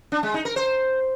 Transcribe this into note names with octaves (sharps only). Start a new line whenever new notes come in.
D4
G#3
D#4
A#4
C5